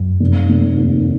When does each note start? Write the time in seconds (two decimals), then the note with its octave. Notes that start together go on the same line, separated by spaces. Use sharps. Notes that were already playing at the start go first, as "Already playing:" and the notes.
Already playing: F#2
0.20 F1
0.49 F1
0.77 D#2